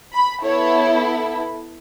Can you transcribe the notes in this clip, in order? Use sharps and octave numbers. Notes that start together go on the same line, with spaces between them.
B5
B3 E4 A4 C#5